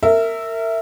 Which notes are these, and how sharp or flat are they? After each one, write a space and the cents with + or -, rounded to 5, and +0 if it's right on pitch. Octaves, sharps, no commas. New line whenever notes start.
A#4 -30 E5 +0